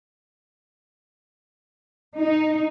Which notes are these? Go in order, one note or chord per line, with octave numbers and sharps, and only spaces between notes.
D#4